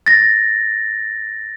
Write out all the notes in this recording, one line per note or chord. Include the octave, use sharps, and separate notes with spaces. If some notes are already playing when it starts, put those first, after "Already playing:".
A6 A#6